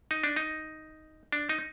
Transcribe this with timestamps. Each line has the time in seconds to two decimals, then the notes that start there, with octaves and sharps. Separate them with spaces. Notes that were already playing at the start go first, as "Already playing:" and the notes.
0.11 D#4
0.24 D4
0.36 D#4
1.33 D4
1.49 D#4